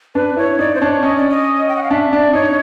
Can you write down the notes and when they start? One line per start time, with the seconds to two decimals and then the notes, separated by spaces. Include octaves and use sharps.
0.15 D4 B4
0.37 E4 C#5
0.59 D#4 D5
0.75 C5
0.81 D4 C#5
1.03 C#4 D#5
1.16 D5
1.30 D#5
1.68 G5
1.76 F#5
1.83 F5
1.91 D4 E5
2.12 D4 D5
2.33 D#4 C#5